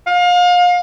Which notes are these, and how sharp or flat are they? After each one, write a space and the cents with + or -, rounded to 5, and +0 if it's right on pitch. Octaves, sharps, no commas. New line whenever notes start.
F5 +30